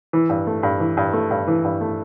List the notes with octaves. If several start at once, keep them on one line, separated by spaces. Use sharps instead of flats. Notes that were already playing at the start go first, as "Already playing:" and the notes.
E3
G2
A3
G2
E3
G2
A3
G2
E3
G2
A3